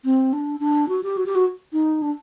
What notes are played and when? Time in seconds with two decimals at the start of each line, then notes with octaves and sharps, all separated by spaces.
0.05 C4
0.33 D4
0.60 D4
0.89 F#4
1.03 G4
1.17 F#4
1.26 G4
1.35 F#4
1.73 D#4
2.02 D4